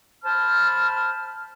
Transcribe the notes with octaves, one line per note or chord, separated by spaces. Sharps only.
C5 A5 B5 F6